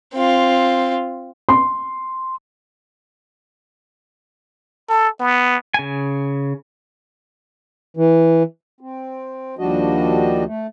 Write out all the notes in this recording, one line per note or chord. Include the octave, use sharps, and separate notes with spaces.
C4 F4
C6
A4
B3
C#3 G#5
E3
C4
D#2 F3 G3 D4 F#4 D#5
A3